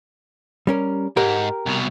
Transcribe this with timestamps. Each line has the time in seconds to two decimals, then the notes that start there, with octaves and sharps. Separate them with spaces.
0.67 G3 C#4 A#4
1.17 G#2 G4 A#4
1.66 C2 B2